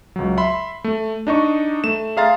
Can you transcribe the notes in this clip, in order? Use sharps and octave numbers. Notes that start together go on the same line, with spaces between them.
C#2 F#3
E5 B5 C6
A3
D4 D#4 D#5 C#6
A3 E7
G#4 E5 F5 A#5 C6 A6